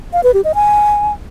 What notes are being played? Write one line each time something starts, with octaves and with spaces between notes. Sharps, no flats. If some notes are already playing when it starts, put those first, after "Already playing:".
F5
B4
G4
D#5
G#5